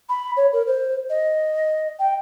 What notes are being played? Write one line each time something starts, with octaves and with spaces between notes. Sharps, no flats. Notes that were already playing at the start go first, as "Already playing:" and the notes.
B5
C#5
A#4
C5
D#5
G5